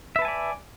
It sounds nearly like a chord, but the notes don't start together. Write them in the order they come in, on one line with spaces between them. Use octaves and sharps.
E5 B4 A5 G#5 D5